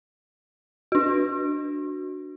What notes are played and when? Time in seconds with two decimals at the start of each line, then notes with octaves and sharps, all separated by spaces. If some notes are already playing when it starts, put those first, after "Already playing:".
0.92 D4 F#4